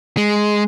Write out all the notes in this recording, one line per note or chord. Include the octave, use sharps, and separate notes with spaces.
G#3